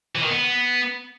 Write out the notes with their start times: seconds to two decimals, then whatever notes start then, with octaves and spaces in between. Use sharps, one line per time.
0.15 E3
0.23 D#3
0.30 B3